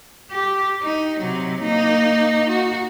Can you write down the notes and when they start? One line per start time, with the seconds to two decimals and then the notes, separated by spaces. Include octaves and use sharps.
0.31 G4
0.83 D#4
1.20 C3 F#3
1.63 A#3 D#4
2.50 F#4